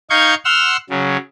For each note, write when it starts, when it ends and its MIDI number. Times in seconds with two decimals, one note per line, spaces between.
0.10 0.35 63
0.10 0.35 77
0.10 0.35 85
0.10 0.35 91
0.10 0.35 92
0.45 0.77 78
0.45 0.77 84
0.45 0.77 88
0.45 0.77 89
0.90 1.17 49
0.90 1.17 54